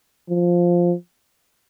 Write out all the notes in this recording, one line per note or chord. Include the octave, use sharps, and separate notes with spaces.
F3